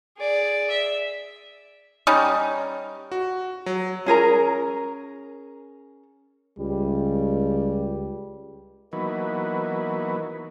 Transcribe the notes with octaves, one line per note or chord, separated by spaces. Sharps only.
G#4 D5
E5
G3 C#4 D#4
F#4
F#3
C#4 G#4 A#4 A#5
C#2 G3
E3 F#3 A#3 B3 D#4